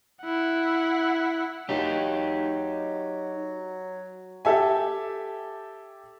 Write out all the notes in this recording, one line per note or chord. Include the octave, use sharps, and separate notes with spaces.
E4 F#5
F#3 D#4 G4
G4 A4 E5 G#5